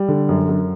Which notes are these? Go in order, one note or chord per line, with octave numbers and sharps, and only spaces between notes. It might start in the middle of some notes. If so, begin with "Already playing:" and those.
Already playing: G3
D3
F#2
F#2